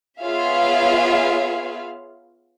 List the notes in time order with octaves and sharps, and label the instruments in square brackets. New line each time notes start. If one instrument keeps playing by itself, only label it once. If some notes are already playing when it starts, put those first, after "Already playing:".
[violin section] B3 F4 G#4 C#5 E5 F5